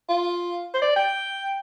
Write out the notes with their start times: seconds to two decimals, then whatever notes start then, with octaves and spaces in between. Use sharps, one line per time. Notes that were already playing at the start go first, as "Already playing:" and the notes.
0.09 F4
0.74 C5
0.82 D5
0.96 G5